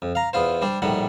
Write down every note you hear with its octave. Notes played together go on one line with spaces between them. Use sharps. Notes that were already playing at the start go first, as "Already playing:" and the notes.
F2
F5 A#5
E2 B3 F4 C5
G3 D4 C5
A#1 A2 D#3 G3 F#5